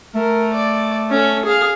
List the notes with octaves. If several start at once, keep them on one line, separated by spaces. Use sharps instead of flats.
A3 A#4
D5
C#4 A4
G#4 F5